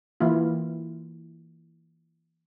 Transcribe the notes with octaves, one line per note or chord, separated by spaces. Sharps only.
E3 A#3 E4 F4